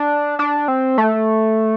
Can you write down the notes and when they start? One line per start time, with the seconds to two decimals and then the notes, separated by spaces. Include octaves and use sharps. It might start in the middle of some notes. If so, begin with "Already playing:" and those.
Already playing: D4
0.39 D4
0.68 C4
0.98 A3